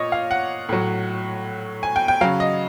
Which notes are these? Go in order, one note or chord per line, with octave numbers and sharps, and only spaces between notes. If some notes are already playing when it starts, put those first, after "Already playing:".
Already playing: A#2 C#5 D#5
F5
F#5
A2 F#3
G#5
G5
G5
C#3 F#3 F5
D#5